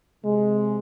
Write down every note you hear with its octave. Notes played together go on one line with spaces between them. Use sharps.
C3 G#3